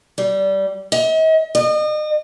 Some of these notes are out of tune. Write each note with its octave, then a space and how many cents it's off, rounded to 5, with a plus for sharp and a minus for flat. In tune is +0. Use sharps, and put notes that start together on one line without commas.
G3 -20
D#5 +45
D#5 -35